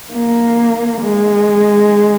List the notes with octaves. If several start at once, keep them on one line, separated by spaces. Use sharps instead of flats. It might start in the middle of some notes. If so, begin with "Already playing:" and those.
A#3
G#3